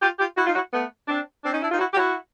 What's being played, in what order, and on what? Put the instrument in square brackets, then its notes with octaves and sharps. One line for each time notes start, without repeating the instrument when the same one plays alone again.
[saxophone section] F4 G4
F4 G4
E4 F#4
D#4 F4
E4 F#4
A3 B3
C4 D4
C4 D4
C#4 D#4
D4 E4
D#4 F4
E4 F#4
G4
E4 F#4